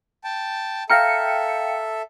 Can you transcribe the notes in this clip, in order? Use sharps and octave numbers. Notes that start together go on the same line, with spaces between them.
G5 A5
A4 E5 F5 G5 A#5 F6 A#6 C#7